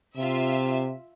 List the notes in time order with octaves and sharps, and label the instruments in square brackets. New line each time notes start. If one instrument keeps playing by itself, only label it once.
[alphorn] C3 [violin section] F4 E5